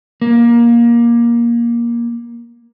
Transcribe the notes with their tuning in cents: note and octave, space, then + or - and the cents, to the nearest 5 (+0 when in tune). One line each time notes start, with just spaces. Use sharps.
A#3 +15